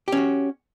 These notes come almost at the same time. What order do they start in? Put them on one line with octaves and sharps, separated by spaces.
G4 C#4 F#4